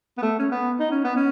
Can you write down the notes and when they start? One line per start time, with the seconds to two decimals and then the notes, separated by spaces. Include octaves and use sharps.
0.18 B3
0.22 A3
0.39 C#4
0.51 B3
0.80 D#4
0.91 C#4
1.04 B3
1.16 C#4